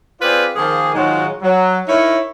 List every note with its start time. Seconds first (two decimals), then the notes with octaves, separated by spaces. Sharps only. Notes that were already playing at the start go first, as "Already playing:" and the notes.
0.21 C4 F4 G#4 B4 C5 D5
0.56 D#3 F3 A#3 G#4
0.94 G#2 D#3 F#3 G#3 F4 F#4
1.42 F#3
1.88 D#4 E4 A#4 C#5